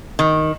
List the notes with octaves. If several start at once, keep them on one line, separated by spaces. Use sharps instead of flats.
D#3